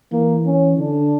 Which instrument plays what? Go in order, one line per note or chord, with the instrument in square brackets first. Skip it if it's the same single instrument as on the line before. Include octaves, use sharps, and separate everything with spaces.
[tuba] E3 [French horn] A#3
[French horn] C#4
[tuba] D3 [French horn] D4